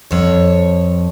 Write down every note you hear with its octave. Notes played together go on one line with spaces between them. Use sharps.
F2 C#5